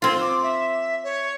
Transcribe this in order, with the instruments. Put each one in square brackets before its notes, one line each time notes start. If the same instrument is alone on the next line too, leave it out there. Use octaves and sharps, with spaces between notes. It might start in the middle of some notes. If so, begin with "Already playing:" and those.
[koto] C4 F4 [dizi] C6
[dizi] D6
E5
C#5